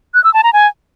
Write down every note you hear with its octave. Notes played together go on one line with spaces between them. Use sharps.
F#6
E6
A5
A#5
G#5